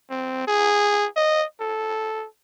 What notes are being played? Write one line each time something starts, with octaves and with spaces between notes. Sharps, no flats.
C4
G#4
D#5
A4